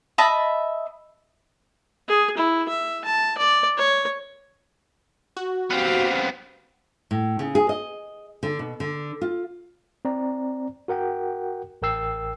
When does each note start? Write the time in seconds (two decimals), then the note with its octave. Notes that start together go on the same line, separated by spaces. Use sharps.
0.18 D#5 E5 A5 B5
2.08 G#4
2.38 E4
2.69 E5
3.05 A5
3.38 D5
3.77 C#5
5.37 F#4
5.70 B3 C4 G4 F5
7.11 A2
7.39 C#3
7.55 G#4
7.69 D#5
8.43 D3
8.59 B2
8.80 D3
9.21 F4
10.05 C4 D5 A#5
10.88 F#4 A#4 F#5 G5
11.82 A1 A#4 G5 E6 C7